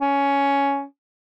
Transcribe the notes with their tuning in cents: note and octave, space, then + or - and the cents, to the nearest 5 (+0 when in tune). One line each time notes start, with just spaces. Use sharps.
C#4 +10